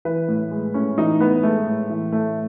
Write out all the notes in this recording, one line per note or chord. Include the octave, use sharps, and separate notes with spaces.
E3 B4
A2
G#3
A2 C#4
E3 D#4
A2 B3
G#3 A3
A2
E3
A2 A3